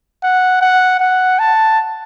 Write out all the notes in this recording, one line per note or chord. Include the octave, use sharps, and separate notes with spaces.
F#5
F#5
F#5
A5